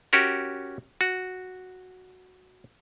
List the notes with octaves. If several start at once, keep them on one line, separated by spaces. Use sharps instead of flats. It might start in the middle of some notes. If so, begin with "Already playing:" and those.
C#4 F#4 G4 A#4
F#4